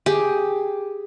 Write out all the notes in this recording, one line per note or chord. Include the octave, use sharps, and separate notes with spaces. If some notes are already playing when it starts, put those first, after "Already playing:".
G4 G#4